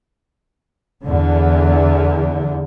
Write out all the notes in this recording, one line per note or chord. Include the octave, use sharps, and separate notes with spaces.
E2 D3